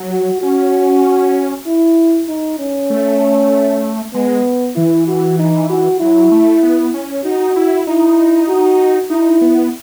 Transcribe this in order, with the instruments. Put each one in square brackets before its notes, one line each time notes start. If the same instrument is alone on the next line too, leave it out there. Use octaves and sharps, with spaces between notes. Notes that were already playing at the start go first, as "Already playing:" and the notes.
Already playing: [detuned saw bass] F#3
[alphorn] F#4
[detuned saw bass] C#4 [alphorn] F#4
[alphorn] E4
D#4
C#4
[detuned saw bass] A3
[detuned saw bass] G#3 [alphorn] B3
[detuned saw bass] E3 [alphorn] E4
[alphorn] F#4
D#4
F#4
[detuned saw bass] F#3 [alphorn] E4
[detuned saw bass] A3
B3
C#4
[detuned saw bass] D#4 [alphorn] F#4
[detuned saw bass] E4
[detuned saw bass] D#4 [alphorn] E4
[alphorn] F#4
[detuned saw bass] D#4 [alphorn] E4
[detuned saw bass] B3